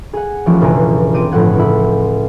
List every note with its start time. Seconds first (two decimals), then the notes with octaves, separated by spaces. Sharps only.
0.13 G#4 F#5
0.46 E3 F3 G3 A3 C#4
0.60 G1 C#2 B2 E4 G#4 A#5
1.14 C4 D6 D#7
1.32 G1 A2 F3 F#5 G#6
1.56 C#2 E4